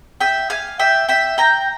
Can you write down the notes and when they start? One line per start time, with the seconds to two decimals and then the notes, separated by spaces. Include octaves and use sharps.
0.20 E5 G5
0.50 F5 G#5
0.79 E5 G5
1.08 E5 G5
1.38 G5 A#5